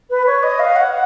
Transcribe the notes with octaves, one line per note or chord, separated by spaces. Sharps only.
B4
C#5
D#5
F5
F#5
F#5